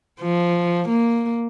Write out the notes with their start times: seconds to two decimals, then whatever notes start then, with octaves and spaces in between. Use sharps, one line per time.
0.21 F3
0.89 A#3